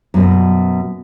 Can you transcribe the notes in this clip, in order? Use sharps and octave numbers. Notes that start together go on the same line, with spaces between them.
F#2 B2